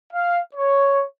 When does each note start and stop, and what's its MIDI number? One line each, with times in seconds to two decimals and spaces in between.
0.12 0.40 77
0.55 1.03 73